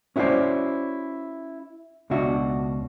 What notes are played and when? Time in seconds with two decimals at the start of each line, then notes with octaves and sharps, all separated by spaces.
0.16 C#4 E4 F#4 A4 C5 D5
2.10 C#2 B2 D4 F#4 E5